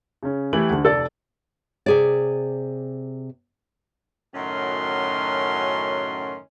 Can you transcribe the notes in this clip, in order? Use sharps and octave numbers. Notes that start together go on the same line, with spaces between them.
C#3 C#4
E3 A3 E4 G4 G5 F#7
D2 D3
F1 A4 D5 A6
C3 G#4 D5
F#2 A2 D#3 C#4 F#4 C6